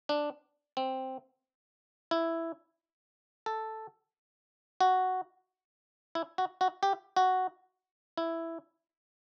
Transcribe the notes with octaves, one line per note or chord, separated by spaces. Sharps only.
D4
C4
E4
A4
F#4
E4
F#4
F#4
G4
F#4
E4